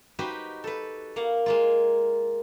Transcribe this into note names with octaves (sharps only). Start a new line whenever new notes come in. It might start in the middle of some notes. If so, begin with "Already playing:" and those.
D#4 F#4 G4 B4 C5
A4 B4
A#3 F5 F#5
G#3 A#3 F4